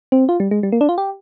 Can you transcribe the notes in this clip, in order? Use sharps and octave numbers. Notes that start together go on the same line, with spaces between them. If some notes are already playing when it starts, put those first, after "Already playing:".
C4
F4
G3
G#3
G3
A#3
D4
F4
G4